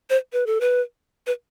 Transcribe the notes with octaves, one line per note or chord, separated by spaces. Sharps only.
C5
B4
A4
B4
B4